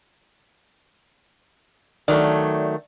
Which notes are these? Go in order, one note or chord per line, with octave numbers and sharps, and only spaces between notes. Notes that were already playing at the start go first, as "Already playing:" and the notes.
D#3 F#3 A3 D5